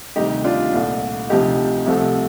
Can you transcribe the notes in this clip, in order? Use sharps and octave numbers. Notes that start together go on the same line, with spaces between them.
D2 C3 D#3 G3 D#4 G4
D4 F4
C2 A#2 A3
D2 C3 F3 D#4 G4
C2 C3 F3 A3